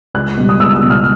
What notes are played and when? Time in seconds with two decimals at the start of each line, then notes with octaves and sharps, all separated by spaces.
0.14 C#2 F#6
0.37 B2 G3
0.49 D#6
0.60 C#2 E6
0.75 D#6
0.82 B2 G3
0.90 F6